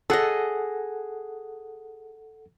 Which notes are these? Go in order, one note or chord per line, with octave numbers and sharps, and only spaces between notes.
G#4 A4 D#5 F#5